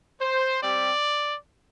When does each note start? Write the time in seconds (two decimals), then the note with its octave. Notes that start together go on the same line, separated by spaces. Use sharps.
0.21 C5
0.61 G3 C4 G4 D5